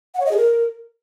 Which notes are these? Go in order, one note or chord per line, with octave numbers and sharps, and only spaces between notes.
F#5
C#5
D#5
G#4
A#4